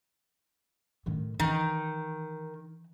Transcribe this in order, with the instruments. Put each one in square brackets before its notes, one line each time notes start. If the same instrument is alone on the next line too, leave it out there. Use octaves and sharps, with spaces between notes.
[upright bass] A2 D#3
[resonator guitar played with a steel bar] D#3 [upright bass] E3